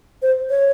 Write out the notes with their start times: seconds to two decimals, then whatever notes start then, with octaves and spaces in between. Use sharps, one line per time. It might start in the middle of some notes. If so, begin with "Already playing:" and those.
0.22 C5
0.50 C#5